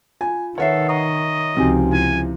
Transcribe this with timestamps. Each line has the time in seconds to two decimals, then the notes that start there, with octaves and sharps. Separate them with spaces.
0.21 F4 G#5
0.58 D#3 A4 B4 C#5 E5 F#5 C7
0.89 D#5 A#5 C#6 D#6
1.57 C#2 C3 F3 D#4 F#4 G#5
1.92 E4 G#5